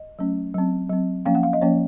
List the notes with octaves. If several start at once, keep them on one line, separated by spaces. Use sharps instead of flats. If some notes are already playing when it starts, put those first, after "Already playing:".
Already playing: D#5
F#3 A3 C#4
F#3 C4
F#3 C4
F3 A#3 C#4 F5
F#5
F5
D#5
F3 A#3 C#4 C#5